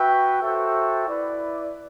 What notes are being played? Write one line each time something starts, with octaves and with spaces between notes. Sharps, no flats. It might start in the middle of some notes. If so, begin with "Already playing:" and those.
Already playing: F#4 B4 E5 G5
F#4 A4 C5 E5 G5
E4 B4 D5